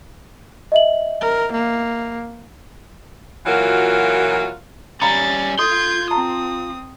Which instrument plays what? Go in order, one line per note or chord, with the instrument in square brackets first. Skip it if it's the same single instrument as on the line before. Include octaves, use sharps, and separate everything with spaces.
[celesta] D#5 E5 F#7
[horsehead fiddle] A#4
A#3
[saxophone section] A#2 E3 F#3 F4 F#4 A#4
[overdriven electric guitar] G3 C#4 [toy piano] F5 A#5 B5 [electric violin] A6
[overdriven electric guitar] F4 C6 [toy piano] A4 [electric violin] G6 G#6
[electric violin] C4 D#6 [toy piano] A5 A#5